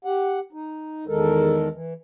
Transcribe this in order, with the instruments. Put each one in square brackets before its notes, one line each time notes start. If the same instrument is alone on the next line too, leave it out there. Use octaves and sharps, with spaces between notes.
[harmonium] G4 F#5
D#4
E2 D#3 G#3 A4 A#4
E3